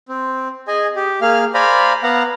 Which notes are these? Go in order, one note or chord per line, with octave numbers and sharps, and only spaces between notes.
C4
G#4 D#5 G#5
G4
A#3 G#4 F5 F6
C5 D5 F5 G#5 A#5 B5
B3 F5 F#5 A#5